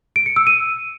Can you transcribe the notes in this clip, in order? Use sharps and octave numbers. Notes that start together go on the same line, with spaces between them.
D7
C#7
E6
D#7